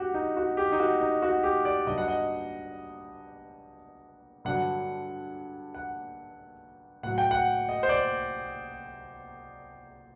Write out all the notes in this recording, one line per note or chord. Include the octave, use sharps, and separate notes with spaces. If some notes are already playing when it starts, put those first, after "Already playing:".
Already playing: G2 F#3 F#4 G4
D#4
F#4
G4
D#4
F#4
D#4
F#4
G4
D5
G2 F#3 D#5
F#5
D#5
G2 D3 F#3 F#5
F#5
A2 F#3 F#5
G5
F#5
D#5
C5
D5